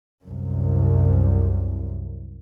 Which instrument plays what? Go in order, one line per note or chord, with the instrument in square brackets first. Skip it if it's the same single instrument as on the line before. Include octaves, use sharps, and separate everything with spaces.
[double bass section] C2 F#2